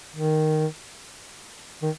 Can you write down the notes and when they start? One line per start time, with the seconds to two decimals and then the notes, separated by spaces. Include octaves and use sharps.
0.16 D#3
1.82 D#3